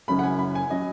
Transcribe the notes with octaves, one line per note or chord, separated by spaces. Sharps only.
F#1 F#2 F#3 C#4 B5
F#5
G#5
B5
G#5
F#3 C#4 D#5